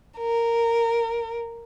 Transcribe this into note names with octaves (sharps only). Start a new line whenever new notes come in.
A#4